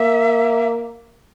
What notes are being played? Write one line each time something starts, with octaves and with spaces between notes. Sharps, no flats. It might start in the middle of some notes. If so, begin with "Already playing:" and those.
Already playing: A#3 E5